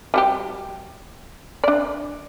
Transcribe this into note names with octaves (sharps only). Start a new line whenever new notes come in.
G3 F#4 G4
D4 D5